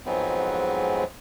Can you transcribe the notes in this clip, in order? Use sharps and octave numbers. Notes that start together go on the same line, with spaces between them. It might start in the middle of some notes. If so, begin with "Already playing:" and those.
F2 G#2 F#3 G#3 B3 C4